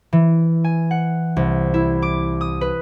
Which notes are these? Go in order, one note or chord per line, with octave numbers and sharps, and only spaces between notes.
E3
G#5
F#5
C2
E4
D6
D#6
B4